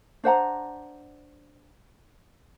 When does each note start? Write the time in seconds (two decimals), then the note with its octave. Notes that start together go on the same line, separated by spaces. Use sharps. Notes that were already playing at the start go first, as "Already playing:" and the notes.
0.24 D4 C5 F#5 A#5